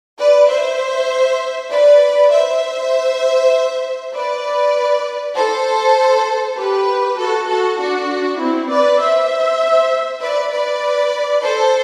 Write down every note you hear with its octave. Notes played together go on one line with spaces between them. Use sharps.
B4 D5
C5 E5
B4 D5
C5 E5
B4 D5
A4 C5
G4 B4
F#4 A4
F#4 A4
D4 F#4
C4 E4
B4 D5
C5 E5
B4 D5
B4 D5
A4 C5